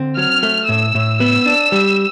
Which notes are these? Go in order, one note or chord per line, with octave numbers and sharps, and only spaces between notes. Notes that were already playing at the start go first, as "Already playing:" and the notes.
Already playing: D3 C4
F#3 F6
A3
A2 E6
A2
B3 E6
D4
G3